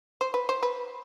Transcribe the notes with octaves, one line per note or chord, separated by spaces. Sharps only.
C5
B4
C5
B4